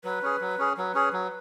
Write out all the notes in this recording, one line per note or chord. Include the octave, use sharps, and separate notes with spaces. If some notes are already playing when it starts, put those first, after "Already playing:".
F#3 B4
C#4 G#4
F#3
C#4 G#4
F#3 B4
C#4 G#4
F#3